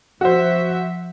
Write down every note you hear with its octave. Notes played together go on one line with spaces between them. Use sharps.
F3 F#4 C5 E5